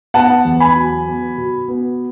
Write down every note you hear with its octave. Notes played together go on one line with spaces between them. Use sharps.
B3 F#5 A5
E2
G#5 B5
F#3
B3
B2
B3